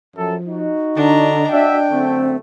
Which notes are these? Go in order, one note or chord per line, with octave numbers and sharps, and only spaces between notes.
F#2 F3 A4
D#4 F#4
D3 D4 D#5 A#5
D4 F#4 E5 G5
F#2 D3 A3 C4